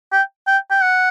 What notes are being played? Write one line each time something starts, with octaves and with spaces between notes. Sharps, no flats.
G5
G5
G5
F#5